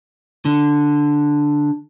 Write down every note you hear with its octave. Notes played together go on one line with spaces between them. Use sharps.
D3